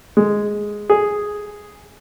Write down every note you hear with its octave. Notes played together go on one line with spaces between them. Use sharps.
G#3
G#4